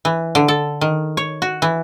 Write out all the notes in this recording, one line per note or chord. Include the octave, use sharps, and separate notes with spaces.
E3
D3
A4
D#3
C#5
F#4
E3